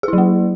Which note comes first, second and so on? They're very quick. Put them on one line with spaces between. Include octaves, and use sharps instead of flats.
G#4 E4 F#3 A#3